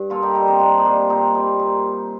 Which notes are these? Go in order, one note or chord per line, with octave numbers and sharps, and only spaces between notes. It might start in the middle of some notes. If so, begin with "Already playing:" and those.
Already playing: G2
A#2 F4 A4
D#4 G4
G3 G4 A#4
C4 D#4
A#2 D4 F4
D#4
G3 D4 F4
A#2 C4 D#4
G3 C4
A#2